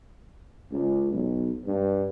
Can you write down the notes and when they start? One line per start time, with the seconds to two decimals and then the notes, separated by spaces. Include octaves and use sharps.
0.71 C#2
1.12 B1
1.65 G2